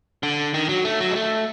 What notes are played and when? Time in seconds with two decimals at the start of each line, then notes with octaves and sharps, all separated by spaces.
0.23 D3
0.54 D#3
0.69 F#3
0.85 A3
1.00 F#3
1.11 G#3
1.16 A3